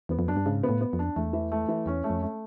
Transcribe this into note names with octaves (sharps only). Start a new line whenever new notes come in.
E2 B3
F2
F#2 D4
G2
G#2 C#3
B3
A2
B3
F2
D4
E2 A3
E3
A3
E3
E2 C#4
A3
F2
A3